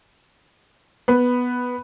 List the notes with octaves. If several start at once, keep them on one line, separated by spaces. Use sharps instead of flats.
B3 B5